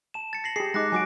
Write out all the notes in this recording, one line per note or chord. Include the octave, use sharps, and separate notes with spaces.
A5 E7
A6 C#7
A#6 C7 F#7
G4 G#4 C7
G#3 D#4 D6 F#6 A#6
F#3 F#4 G#5 D6 D7